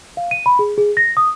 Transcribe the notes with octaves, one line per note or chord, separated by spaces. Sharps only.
F5
D#7
B5
G#4
G#4
A#6
D#6